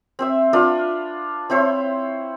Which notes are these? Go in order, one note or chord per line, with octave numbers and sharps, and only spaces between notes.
C4 C5 E5
D4 F4 B4 F5
C4 E4 C5 C#5